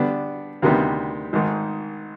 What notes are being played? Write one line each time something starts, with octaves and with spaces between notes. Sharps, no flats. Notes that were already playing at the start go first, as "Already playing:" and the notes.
Already playing: D3 G3 B3 D4
D2 C3 D#3 G3 B3
G#1 G#2 D#3